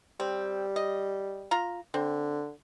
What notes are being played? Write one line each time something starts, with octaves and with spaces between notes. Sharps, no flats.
G3 C4
D#5
F4 A#5
D3 C4